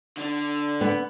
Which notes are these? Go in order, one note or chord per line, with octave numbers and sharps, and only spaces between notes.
D3
B3